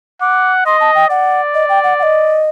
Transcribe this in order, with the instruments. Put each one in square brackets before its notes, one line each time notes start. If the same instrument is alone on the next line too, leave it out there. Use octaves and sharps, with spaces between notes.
[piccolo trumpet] F#5 [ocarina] D6
[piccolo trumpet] D#5 [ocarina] C6
[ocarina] A5
G5
[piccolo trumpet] D5 [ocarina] F#5
[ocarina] D#5
G5
F#5
F#5
D#5